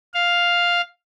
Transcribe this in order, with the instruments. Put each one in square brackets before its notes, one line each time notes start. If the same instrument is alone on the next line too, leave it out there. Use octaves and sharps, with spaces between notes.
[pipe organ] F5